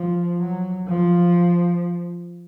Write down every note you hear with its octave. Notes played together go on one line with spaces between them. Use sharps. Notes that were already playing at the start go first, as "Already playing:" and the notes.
Already playing: F3
F#3
F3